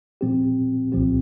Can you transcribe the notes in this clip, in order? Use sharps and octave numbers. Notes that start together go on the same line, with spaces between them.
A#2 F3 C4 G4
C2 A#2 F3 C4 G4